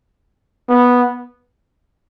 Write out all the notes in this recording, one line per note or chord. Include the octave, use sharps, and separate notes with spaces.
B3